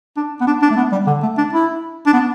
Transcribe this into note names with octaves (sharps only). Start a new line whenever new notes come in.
D4
B3
D4
D4
A3
B3
G3
D3
A3
D4
E4
D4
B3